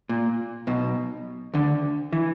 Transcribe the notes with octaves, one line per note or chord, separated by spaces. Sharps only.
A#2
B1 B2
D2 D3
E3